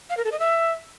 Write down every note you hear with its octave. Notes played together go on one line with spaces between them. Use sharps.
F5
A#4
A4
D#5
E5